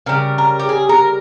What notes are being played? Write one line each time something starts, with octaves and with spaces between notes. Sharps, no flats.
C#3 G3 A#4
A#4
G4
G#4
A#4